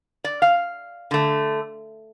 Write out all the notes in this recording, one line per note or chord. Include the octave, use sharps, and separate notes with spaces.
D5
F5
D3 A3